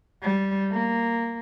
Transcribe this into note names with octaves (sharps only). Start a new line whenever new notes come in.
G3
A#3